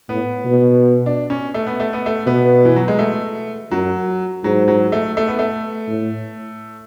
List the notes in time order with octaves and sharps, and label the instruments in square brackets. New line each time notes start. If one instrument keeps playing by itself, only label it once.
[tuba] A2 [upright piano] B3
[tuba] B2
[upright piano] D4
C#4
A3
B3
A3
B3
A3
[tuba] B2 [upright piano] B3
[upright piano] E3
F#3
G#3
A3
[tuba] F#2 [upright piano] F#3
[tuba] G#2 [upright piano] F#3
[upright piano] F#3
A3
A3
B3
A3
[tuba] A2